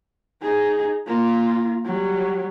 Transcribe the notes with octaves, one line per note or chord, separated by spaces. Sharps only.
D#4 G#4
A#3 F4
F#3 G3